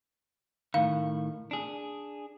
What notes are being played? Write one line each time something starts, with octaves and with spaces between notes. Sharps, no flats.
A2 D#3 F5
D4 G#4